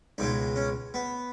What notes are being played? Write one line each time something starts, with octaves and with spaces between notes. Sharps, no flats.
C#2 B2 G#3 D#4
C#4
B3